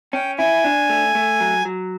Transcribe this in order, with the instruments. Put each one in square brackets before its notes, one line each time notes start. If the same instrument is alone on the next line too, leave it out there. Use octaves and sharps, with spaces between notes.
[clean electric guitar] C#4 [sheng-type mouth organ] G5
[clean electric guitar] E4 [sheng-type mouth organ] G#5
[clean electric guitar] D4
A3
A3
F#3
F#3